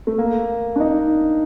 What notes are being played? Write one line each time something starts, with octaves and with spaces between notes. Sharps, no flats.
A3
A#3
D4
D#4